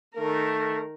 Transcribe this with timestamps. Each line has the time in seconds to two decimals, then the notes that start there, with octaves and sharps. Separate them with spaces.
0.16 D#3 A3 A#4